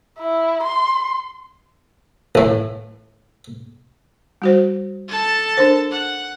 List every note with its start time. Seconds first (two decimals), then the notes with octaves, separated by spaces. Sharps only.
0.18 E4
0.63 C6
2.35 A1 A2
4.42 G3 F#4 C5
5.08 A4 A5
5.57 D4 A#4 C5
5.91 F#5